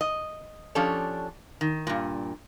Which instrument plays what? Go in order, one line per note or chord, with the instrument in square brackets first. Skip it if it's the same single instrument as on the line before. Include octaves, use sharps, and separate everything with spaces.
[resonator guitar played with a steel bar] D#5
F3 C#4 D4 G4 A4 C#5
D#3
G2 A#2